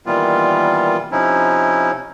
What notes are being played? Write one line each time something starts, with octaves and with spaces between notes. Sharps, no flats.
A#2 D#3 E3 G3 B3 F4
C3 F3 C#4 D#4 E4